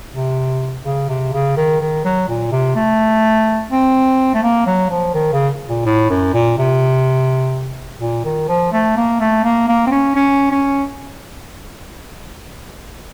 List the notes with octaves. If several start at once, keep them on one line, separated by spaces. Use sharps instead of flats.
C3
C#3
C3
C#3
D#3
D#3
F#3
A#2
C3
A3
C4
A3
A#3
F#3
F3
D#3
C#3
A#2
A2
F#2
A#2
C3
A#2
D#3
F3
A3
A#3
A3
A#3
A#3
C4
C#4
C#4
C#4